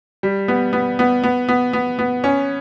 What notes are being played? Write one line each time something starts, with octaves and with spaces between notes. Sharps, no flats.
G3
B3
B3
B3
B3
B3
B3
B3
C#4